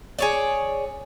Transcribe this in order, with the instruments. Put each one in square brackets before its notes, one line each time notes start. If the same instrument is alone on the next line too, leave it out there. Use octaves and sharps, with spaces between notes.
[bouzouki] G#4 C#5 D5